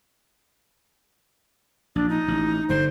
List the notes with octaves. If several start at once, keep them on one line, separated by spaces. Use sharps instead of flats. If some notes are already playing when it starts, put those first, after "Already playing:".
A#1 D4
D#4
A1
G1 D3 G3 C5